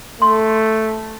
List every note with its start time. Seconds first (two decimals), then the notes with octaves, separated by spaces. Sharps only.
0.22 A3 C6 C#6